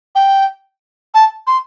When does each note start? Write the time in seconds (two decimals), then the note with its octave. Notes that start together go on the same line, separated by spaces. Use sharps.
0.15 G5
1.14 A5
1.47 C6